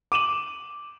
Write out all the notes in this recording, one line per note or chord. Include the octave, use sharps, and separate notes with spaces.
D6 D#7 E7 F#7